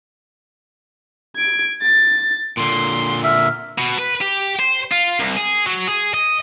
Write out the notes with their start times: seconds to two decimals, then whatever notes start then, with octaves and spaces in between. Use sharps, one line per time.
1.36 G#6 D7
1.82 A6
2.57 A#2 D3 C6
3.24 E5 F6
3.79 B2
3.99 B4
4.22 G4
4.59 C5
4.91 F4
5.20 C2
5.37 G#4
5.66 F#3
5.88 G#4
6.14 D#5